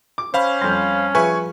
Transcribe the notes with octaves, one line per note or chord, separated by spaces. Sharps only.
D6
C#4 C5 F5 B5
F2 G3 C6 G6
F3 F4 G#4 B4 E5 G#5 C#6